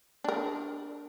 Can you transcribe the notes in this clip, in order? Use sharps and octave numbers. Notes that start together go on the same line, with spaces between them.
D4 A#4